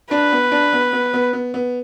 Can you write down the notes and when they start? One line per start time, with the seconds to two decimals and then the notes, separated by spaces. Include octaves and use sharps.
0.11 D4 B4
0.32 B3
0.52 D4
0.73 B3
0.93 B3
1.13 B3
1.33 B3
1.54 B3